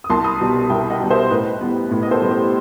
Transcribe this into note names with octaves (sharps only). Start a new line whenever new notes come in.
D#6
C2 A5 C6
B5 D#6
B2 G3
C2 E5 G5
D#5 F#5
B2 G3
C5 E5
A2 B4 D#5
G3 B3
A2
D#5
A4 C5
G3 B3
G4 B4